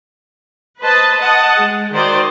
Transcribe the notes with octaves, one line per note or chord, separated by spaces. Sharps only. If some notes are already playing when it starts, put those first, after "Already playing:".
B4 C5 D#5 A5
D#5 F#5 A5
G#3
D#3 F#4 C5 D5 D#5